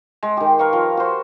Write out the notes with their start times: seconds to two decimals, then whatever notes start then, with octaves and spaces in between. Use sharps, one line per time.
0.23 G#3
0.37 D#3 G4
0.59 A#4 B4 F5 C#6
0.73 F3
0.97 F#4 C5